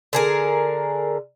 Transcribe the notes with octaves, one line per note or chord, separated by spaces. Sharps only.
D3 G#4 A#4